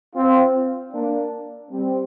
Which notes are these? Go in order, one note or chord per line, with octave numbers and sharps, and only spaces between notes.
C4 F4
A#3 D4
G3 C4